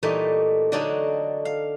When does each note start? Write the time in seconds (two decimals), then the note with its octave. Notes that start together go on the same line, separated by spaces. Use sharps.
0.03 A#2 E3 G3 A3 D#4
0.72 D3 F#3 D4 D#4 F#4 A4
1.45 F5